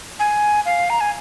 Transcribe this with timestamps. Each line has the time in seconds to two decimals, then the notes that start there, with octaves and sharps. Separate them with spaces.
0.19 G#5
0.66 F5
0.90 A#5
1.01 G#5